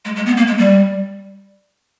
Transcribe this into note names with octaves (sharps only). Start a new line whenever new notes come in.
G#3
G#3
B3
A#3
G#3
G3